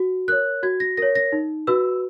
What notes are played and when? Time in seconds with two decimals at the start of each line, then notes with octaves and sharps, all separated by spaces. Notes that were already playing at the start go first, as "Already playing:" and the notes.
Already playing: F#4
0.28 A#4 C#5 F#6
0.63 F#4 G#6
0.80 A#6
0.97 A#4 C#5 A#6
1.15 A#6
1.32 D#4
1.67 F#4 B4 E6